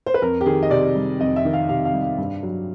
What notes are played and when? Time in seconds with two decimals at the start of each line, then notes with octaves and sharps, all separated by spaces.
0.06 C5
0.14 B4
0.22 F2 A#4
0.41 G4
0.46 D#3 G#4
0.63 D#5
0.70 C3 D5
0.96 G3
1.19 F2 D#5
1.36 E5
1.45 D#3
1.53 F5
1.69 C3 F5
1.85 F5
1.93 G3
2.03 F5
2.18 G2
2.43 F#3